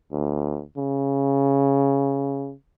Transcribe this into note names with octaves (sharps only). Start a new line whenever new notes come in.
D2
C#3